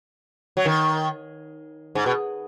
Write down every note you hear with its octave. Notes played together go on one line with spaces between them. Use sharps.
F#3
D#3
G#2
B2